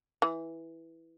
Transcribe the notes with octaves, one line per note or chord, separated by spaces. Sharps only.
E3